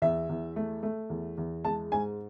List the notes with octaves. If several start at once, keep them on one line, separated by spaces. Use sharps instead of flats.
E2 E5
E2
A3
A3
E2
E2
G#3 A5
G#2 G#5